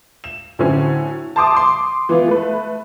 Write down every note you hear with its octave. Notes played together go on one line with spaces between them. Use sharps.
E7
A2 D3 F#3 C4 C#4
A5 C6 D6 D#6
C6 D6 D#6
E3 B3 F4
A3 B4